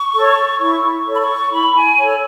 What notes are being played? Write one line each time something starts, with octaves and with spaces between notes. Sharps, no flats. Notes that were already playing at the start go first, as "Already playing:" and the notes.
Already playing: C#6
A4 C#5
E4 C#6
A4 C#5
B5
C#6
E4 B5
G#5
A4 C#5